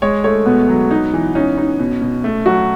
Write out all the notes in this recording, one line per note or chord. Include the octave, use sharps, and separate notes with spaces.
G#3 C#5
A3 C#5
B2 B3
F#3
D#4
E3
C#4 D#4
D#4
B2
B2
A3
F#3 F#4